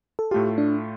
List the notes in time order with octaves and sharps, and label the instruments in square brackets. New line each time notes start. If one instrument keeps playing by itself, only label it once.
[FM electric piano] A4
[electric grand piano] A2 A3 F4 [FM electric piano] G4
[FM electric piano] D4